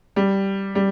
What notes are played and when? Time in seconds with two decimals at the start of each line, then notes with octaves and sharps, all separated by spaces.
0.16 G3
0.75 G3